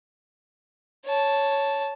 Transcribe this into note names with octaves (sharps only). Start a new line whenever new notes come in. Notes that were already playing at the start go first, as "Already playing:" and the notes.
C#5 A5